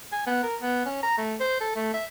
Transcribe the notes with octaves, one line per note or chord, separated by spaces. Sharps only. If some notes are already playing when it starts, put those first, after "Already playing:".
G#5
B3
A#4
B3
C#4
A#5
A3
C5
A4
A3
E5